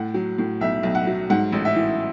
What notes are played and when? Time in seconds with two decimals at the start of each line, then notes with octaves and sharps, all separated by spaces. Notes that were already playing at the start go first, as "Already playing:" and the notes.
Already playing: A2 F#5
0.14 F#3
0.38 A2
0.61 B1 E5
0.83 B1
0.95 F#5
1.07 F#3
1.30 G#2 F#5
1.52 A1
1.65 E5
1.76 E3